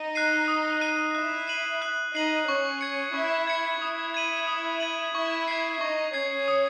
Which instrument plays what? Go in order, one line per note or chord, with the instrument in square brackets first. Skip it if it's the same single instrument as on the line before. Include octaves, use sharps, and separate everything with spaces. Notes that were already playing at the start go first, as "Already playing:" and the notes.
Already playing: [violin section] D#4 D#5
[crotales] F#6 C7 D#7
D#6
F#6 C7 D#7
[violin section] E4 E5 [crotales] F#6
[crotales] C7 D#7 F#7
F#6
[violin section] D#4 D#5 [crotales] C7 D#7 F#7
[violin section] C#4 C#5 [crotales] C#6
[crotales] G#6 C#7
[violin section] E4 E5 [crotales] C#6
[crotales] G#6 C#7
[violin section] E4 E5 [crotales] D#6
[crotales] G#6 D#7 F#7
D#6
G#6 D#7 F#7
[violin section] E4 E5 [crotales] C#6
[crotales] G#6 C7
[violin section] D#4 D#5 [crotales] C#6
[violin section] C#4 C#5 [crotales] G#6 C7
[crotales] D#6